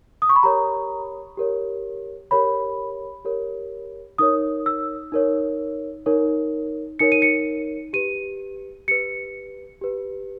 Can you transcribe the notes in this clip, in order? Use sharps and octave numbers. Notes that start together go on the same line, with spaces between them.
D#6
C#6
B5
G4 A#4 C#5 A#5
G4 A#4 C#5
G4 A#4 C#5 B5
G4 A#4 C#5
D#4 A#4 C#5 D#6
E6
D#4 A#4 C#5
D#4 A#4 C#5
D#4 A#4 C#5 C#7
D#7
C#7
G4 B4 D#7
G4 B4 C#7
G4 B4